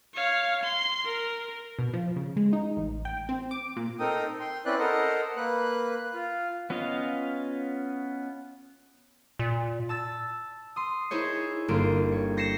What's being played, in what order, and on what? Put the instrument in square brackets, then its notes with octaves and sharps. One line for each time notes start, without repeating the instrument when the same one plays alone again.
[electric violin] C#5 F5
C6
A#4
[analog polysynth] B2
F3
C#3
G#3
D#4
A1
G5
C4
D6
A#2
[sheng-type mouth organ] C4 D#4 A4 A#4 G5 D#6
G5 C6
C4 C#4 E4 B4 D5 F#6
A4 A#4 C5 D#5 F#5
A#3 B4 F#6
F4
[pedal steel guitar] B3 C#4 F4 D#5 F5
[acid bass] A#2
[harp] A5 E6 A6
C6 D#6
D#4 E4 G#4 C5 C#5
G1 A#3 C5 D7
C#5
G6 A#6 C7 C#7 E7